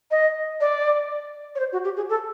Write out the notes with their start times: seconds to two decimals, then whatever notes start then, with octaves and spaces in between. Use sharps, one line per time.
0.11 D#5
0.61 D5
1.55 C#5
1.59 C5
1.72 F#4
1.84 G4
1.97 G#4
2.09 A4